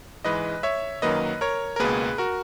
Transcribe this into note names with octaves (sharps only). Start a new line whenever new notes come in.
G#2 E3 G#3 B4 D#5
C#5 E5
F#2 D#3 F#3 A#3 B4 D#5
A#4 C#5
A#4
C#2 B2 A#3 G#4 B4
F#4 A#4